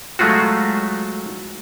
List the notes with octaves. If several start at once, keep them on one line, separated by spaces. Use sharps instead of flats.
F#3 G#3 A3 F4 F#4